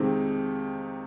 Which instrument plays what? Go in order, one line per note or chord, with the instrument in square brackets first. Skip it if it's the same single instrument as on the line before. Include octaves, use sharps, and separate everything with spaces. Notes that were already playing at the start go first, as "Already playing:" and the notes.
Already playing: [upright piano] F2 C3 D#3 G#3 C4